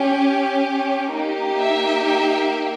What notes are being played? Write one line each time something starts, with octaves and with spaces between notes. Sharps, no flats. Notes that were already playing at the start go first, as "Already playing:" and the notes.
Already playing: C#4 G4
A#3 D#4 G4
E5
E5